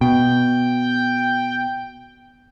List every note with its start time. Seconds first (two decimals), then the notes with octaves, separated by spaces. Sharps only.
0.01 B2 G5